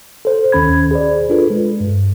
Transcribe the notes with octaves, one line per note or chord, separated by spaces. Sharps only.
A4 C5
D#2 D#3 C#4 B5 G#6
G#4 C5 D5
D4 F4 A4 B4
G#3
G2